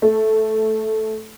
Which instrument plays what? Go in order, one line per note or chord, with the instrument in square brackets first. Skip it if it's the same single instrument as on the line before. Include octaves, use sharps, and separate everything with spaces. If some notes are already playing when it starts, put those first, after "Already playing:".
[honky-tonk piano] A3